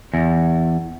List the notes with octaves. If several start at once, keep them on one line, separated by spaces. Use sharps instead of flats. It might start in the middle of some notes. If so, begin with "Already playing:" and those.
E2